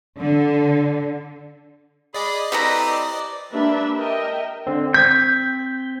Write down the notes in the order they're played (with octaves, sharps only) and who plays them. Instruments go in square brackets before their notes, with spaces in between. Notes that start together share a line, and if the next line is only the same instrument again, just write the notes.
[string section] D3
[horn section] G#4 B5 [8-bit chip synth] D5 D#5
[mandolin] A3 B4 A#5 [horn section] C4 E4 G4
[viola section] A#3 D4 G4 B4 E5
A#4 D#5 E5 G5
[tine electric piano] D3 C4
[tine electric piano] C4 G#6 B6 [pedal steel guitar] G6